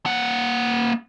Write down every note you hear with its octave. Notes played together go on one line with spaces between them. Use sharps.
A#3 F#5